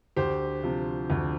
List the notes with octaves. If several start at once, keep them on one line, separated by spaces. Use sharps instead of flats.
D2 G4 C5
C3 F3
D2